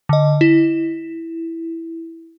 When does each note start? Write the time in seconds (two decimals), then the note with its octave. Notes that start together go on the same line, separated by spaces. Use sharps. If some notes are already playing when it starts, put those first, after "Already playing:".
0.09 D3 D#5
0.41 E4